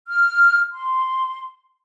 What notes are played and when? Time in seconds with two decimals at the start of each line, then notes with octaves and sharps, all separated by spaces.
0.07 F6
0.72 C6